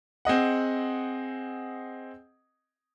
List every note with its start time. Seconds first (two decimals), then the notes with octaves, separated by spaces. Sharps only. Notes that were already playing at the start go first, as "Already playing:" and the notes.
0.25 C4 G#4 D#5 F#5